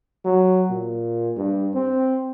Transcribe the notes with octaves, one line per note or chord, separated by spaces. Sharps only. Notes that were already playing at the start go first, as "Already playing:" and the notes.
F#3
A#2
G2
C4